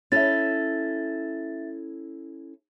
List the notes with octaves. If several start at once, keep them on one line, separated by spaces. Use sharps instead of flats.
C#4 E4 A4 E5 A6